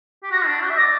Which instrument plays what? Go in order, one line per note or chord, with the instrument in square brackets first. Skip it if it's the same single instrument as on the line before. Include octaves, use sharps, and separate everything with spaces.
[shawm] G4
[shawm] F#4 [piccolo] A#6
[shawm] D4 [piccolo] A#6
[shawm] F#4 [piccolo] G6
[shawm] E5
[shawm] D5 [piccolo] A#6